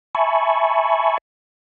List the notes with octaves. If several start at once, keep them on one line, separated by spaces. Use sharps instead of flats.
E5 G#5 A5 B5 C#6